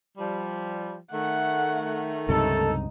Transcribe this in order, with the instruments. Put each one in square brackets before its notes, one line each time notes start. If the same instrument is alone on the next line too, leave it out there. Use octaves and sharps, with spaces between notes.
[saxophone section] F3 G3
[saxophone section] D#3 A3 [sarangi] F#5
[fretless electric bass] C#2 G2 C3 [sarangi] D#4 [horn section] A4